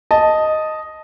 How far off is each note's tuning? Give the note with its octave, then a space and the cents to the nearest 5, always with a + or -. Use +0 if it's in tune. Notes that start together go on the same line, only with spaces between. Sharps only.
D#5 +0 A5 +0